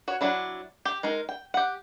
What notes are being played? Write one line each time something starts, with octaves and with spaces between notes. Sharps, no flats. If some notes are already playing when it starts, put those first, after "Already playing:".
F#4 C#5
F#3 D4 E4
G4
G#3 D#4 A#4
G5
G4 F#5